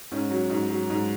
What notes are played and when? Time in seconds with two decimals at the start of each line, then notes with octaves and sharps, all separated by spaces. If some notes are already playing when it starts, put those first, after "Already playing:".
0.12 G#2 C#4
0.30 F#3
0.50 G#2
0.70 F#3
0.90 G#2